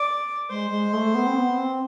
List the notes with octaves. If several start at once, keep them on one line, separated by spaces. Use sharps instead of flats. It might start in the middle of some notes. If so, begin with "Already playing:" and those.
Already playing: D5
G#3 C5
G#3
A3
B3
C4
B3
C4